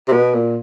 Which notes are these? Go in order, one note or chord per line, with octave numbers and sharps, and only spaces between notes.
C3
B2
A#2